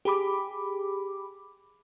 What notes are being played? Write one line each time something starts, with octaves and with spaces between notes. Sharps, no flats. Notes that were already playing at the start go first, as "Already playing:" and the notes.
G4 G#4 B5 D6